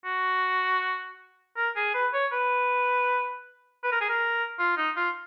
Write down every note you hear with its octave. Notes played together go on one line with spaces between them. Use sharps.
F#4
A#4
G#4
B4
C#5
B4
B4
A#4
G#4
A#4
F4
D#4
F4